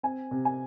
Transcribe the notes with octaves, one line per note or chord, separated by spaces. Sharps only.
C4 G#5
C3
G#5